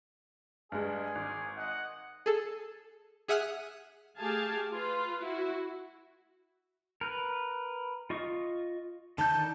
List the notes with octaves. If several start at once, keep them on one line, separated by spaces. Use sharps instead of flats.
G2 G#3 G#4 G#5
G#1
D#5 F#5
G#4 A4
G#4 E5 F#5 D#6 F6 F#6
A3 G4 G#4 F5 G#5 A5
F4 B4
E4 F#4
A#4 B4
F4 D#5 C#6
D3 D#3 A5 G6